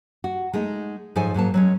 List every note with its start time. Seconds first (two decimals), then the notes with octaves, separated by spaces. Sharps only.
0.24 F#4
0.53 G#3 A3 D#4
1.16 G#2 F3 D#4 A4 C#5 G#5
1.34 G#2 F#3 A#3 A5
1.54 F#3 G#3 C#4